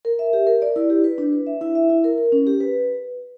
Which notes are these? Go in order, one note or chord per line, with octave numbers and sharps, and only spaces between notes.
A#4
E5
G4
A#4
D5
E4
G4
B4
D4
B4
E5
E4
E5
E4
A#4
A#4
C#4
G4
B4